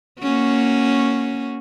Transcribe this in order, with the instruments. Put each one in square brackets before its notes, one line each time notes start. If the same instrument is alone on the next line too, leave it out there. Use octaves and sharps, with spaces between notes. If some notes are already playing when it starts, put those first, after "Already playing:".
[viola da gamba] A#3 C#4 F#4